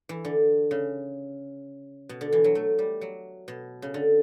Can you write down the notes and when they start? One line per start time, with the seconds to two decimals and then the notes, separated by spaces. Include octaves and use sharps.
0.09 E3
0.25 D3
0.71 C#3
2.09 B2
2.21 D3
2.32 E3
2.44 F#3
2.55 A3
2.79 G3
3.01 F#3
3.48 B2
3.82 C#3
3.94 D3